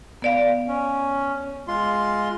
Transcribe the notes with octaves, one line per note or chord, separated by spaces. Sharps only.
B3 D5 F5
C#4
G#3 F4 C6